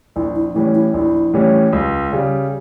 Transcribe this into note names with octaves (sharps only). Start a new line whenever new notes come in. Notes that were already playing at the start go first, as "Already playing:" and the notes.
A#1 E4
E4
A2 E3 G3 C#4 E4
E4
A#1 E4
A2 E3 G3 C#4
C#2
C#3 G3